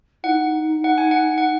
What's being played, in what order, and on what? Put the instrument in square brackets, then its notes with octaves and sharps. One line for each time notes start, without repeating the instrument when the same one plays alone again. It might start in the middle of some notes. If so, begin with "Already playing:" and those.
[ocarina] D#4 E4 [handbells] F#5
[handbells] F#5
G#5
F#5
F#5